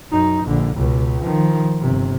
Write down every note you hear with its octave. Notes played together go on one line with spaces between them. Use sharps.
F#2 D#4
A#1 D3
C#2 B2
D#3 F3
G1 C3